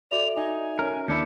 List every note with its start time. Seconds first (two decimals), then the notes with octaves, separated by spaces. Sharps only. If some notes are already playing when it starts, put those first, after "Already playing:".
0.11 F#4 A4 D5 E5 F7
0.36 D#4 G#5
0.79 C#4 A#4
1.08 D#2 D4 E4 G6 C#7